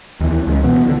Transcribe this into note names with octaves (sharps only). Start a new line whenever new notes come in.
D#2 E3
C#2 G#3
B2 E3 B3
D3 E3